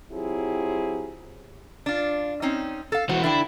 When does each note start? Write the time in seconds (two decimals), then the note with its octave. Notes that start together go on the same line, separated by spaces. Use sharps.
0.12 F#3 C4 E4 F4 G4 G#4
1.86 D4 F4
2.42 C4 C#4 D#4
2.92 A4 F5
3.09 E3 F#4 C5
3.23 D3 D4 E4 G5